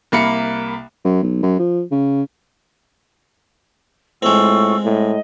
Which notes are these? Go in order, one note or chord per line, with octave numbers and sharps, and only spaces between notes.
C2 A#3 B5 C#7
F#2
B1
F#2
F3
C#3
A2 G#3 C4 F4 C#6 E6
A2 D#5